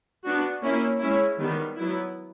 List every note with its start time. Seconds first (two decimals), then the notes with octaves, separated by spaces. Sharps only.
0.24 B3 D4 F#4
0.62 A#3 C#4 E4
1.00 G#3 C#4 E4
1.38 D#3 G3 B3
1.77 F#3 B3 E4